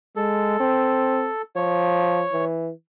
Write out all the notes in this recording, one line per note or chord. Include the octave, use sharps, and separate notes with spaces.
G#3 A4
C4
F3 C#5
E3